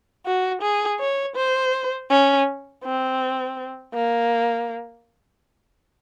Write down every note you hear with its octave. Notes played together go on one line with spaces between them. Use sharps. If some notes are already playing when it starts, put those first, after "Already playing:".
F#4
G#4
C#5
C5
C#4
C4
A#3